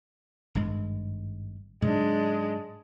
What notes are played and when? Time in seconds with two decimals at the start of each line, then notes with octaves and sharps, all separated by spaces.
0.55 G#1 G2 G#3
1.82 G#2 C#3 F#3 G#3 D4